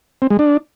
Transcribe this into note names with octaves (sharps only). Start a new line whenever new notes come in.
C4
G#3
D4